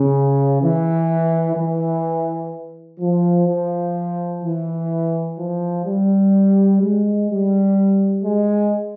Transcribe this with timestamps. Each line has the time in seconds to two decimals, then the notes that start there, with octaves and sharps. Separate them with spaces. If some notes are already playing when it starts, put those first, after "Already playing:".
Already playing: C#3
0.62 E3
1.56 E3
3.00 F3
3.48 F3
4.43 E3
5.38 F3
5.85 G3
6.81 G#3
7.30 G3
8.24 G#3